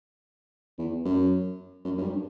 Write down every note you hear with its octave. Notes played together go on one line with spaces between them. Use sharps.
E2
F#2
F#2
F#2
G2